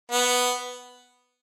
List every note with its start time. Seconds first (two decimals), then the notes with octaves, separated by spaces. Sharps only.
0.11 B3